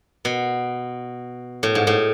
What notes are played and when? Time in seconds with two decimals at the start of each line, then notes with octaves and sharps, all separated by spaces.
0.25 B2
1.63 A2
1.75 G#2
1.87 A2